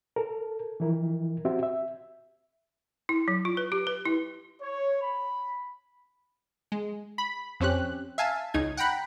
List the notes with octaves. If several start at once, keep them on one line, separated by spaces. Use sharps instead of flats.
A4 A#4
E3 F3 E4 A#4
C4 F#4 G4 E5
E5
E4
F#3
F4
B4
G4
B4
E4
C#5
B5
G#3
B5
F2 C4 C#4 G4 F#6
E5 F5 G#5 A5
C#2 D#4 G#6
F#5 G5 A#5 B5 F#6